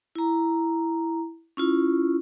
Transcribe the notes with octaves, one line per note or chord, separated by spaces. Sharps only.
E4 A#5
C#4 E4 F4